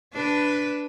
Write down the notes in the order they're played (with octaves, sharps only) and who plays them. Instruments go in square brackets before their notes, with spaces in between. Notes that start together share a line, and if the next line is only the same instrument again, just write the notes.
[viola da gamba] D4 B4